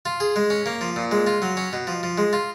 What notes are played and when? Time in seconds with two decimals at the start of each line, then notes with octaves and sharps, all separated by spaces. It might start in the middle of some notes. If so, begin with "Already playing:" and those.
0.05 F4
0.20 G#4
0.36 G#3
0.50 C#4
0.66 A#3
0.81 F3
0.96 A#2
1.11 G#3
1.27 F4
1.42 F#3
1.57 C#4
1.73 B2
1.87 F3
2.03 F3
2.18 G#3
2.33 F4